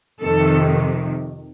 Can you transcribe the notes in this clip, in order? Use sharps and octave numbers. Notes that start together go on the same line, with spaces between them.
F2 C3 D#3 A4